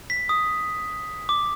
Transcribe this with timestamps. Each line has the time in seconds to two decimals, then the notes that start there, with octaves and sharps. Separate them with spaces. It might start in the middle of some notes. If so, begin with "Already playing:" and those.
0.10 B6
0.29 D#6
1.29 D6